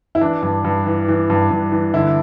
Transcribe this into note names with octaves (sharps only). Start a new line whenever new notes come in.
E4
E3 D4
G2
G2
E3
E3
G2
G2
E3
D3 E4